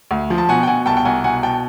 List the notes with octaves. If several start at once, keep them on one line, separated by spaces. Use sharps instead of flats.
D2
F3
A5
B2 F#5 G#5
G5
B2 F#5 G#5
C2 G5 A5
G5
C2 F#5 G#5
B2 F#5 G#5
B2 G5 A5